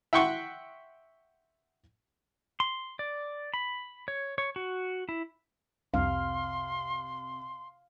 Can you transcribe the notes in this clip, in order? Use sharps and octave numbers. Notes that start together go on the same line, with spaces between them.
E5 F#5 G5 C6 C#6
C6
D5
B5
C#5
C#5
F#4
E4
C2 F2 C3 F5 C6